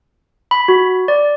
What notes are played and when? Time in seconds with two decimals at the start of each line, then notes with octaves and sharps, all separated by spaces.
0.51 B5
0.68 F#4
1.08 D5